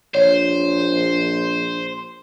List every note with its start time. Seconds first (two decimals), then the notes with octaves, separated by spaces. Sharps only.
0.15 A#1 C5 C#5